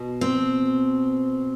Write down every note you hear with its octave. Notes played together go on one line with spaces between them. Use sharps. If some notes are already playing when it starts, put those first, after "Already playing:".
Already playing: B2
C4